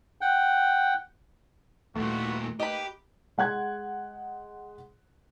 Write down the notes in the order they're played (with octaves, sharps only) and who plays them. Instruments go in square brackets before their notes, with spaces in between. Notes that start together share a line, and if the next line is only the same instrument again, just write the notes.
[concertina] F#5 G5
[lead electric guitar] D#2 A#2 [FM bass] A3 [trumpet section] E4 F#4 B4
[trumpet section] A#3 D#4 B4 [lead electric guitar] G4 [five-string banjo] D#5 B5
[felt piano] G#3 F#5 F#6 G#6